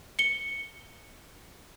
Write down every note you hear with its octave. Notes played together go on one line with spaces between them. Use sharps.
C#7 G7